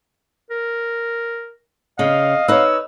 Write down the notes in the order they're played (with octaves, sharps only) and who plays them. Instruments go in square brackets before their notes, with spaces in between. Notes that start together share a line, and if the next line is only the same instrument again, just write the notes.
[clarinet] A#4
[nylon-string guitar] C#3 [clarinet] D#5 [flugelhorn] F5
[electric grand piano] D#4 C#5 [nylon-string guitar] B4 D#5 [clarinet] E6